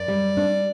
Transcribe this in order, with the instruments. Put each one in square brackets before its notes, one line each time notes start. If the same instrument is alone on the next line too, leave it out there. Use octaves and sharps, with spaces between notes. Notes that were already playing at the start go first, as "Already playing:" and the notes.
Already playing: [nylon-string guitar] F#2 [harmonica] D5
[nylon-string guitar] G3
D4